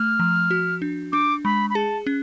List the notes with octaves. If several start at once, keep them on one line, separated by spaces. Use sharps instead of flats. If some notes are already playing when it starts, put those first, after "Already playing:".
Already playing: A3 F6
F3
F#4
D4
D4 D6
G#3 B5
B5
G#4 A5
C#4